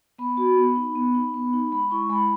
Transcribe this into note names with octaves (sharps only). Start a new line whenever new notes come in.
B3 B5
F#4
B3
D#4
B3
D#4
B3
D#4
G#3 B5
E4 C#6
G#3 B5